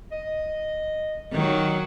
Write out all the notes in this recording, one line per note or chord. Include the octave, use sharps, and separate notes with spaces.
D#5
D#3 F#3